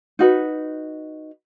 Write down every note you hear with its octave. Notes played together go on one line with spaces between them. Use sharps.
D#4 F#4 B4